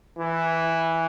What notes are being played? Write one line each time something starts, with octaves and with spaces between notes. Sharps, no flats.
E3